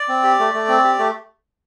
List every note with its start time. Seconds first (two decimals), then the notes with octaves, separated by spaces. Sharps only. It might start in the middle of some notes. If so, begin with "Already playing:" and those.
Already playing: D5
0.09 C4
0.24 G4
0.39 A3
0.54 A3
0.69 C4
0.84 G4
0.99 A3